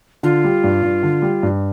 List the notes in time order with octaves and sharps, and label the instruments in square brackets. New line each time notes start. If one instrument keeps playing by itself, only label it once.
[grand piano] D3 [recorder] F4
[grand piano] G3
G2
G2
D3
G3
G2